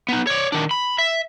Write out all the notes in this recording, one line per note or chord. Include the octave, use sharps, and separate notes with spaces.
B3 D#4
C#5 D5
D#3 D4
B5
E5